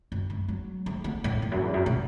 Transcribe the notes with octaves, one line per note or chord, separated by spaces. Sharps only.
F#2
A3
F#3
A3
B3
A2
E2
F#2
E2
F#2
B2